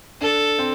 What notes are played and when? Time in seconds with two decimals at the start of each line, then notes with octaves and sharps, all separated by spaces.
0.21 D4 A4
0.59 C4